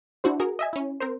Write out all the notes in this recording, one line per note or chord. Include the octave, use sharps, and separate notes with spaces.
D4 E4 F#4 C5
F#4 G#4 A#4
D#5 E5 G#5
C#4 E4
C4 A#4 C5